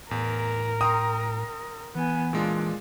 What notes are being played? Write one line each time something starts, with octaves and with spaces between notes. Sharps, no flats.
E2 A2 A#4
G5 A#5 C6 D#6
E3 B3 G#5
A#2 G#3 D4 F4